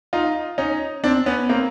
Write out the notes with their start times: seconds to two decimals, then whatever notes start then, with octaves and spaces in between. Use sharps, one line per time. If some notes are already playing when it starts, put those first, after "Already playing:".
0.13 D#4 F4
0.58 C#4 D#4
1.04 C4 D4
1.26 B3 C#4
1.49 A#3 C4